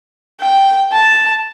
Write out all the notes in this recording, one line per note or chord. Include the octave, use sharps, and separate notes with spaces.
G5
A5